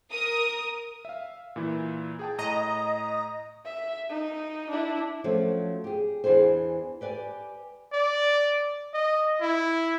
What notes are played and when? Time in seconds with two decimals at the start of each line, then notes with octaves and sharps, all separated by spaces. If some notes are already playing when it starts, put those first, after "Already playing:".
0.11 A#4 D#6
1.05 E5 F5
1.56 A#2 E3 E4
2.19 G#4 G5 A5
2.38 A2 D#5 A#5 D#6
3.65 E5
4.10 D#4
4.71 D4 E4
5.24 F3 F#3 A3 C#4
5.84 G4 G#4
6.24 E2 E3 D4 G#4 C5
7.01 G4 B4 D5 G#5
7.93 D5
8.94 D#5
9.41 E4